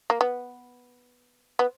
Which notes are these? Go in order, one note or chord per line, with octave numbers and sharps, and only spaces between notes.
A#3
B3
B3